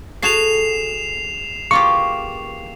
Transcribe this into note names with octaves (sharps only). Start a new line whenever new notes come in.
F#4 G#4 A4 C#5 A5 C7 E7 F7
C#3 E3 A#3 F4 G4 C#6